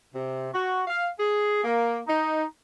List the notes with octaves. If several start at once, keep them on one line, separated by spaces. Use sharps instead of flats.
C3
F#4
F5
G#4
A#3
D#4